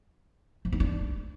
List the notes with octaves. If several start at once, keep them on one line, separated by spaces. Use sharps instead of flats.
F3
D#4
D4